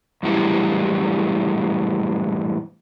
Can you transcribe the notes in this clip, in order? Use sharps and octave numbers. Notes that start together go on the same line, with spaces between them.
F#2 A2 E3 G3